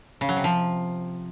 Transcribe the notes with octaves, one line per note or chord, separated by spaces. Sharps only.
C#3
F#3
C3
F3